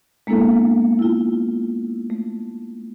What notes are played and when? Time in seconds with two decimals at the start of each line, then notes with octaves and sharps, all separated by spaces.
0.27 G#3 A#3 B3 D4 E4 A4
0.99 E4 F4
2.10 A3